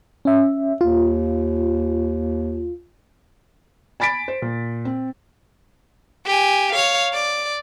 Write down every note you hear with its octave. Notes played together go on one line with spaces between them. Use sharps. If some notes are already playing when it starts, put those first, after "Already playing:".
C#4 E5
D#2 F4
G#5 B5 A6 B6 D7
C5
A#2
C4
G4 G#5
C#5 F5
D5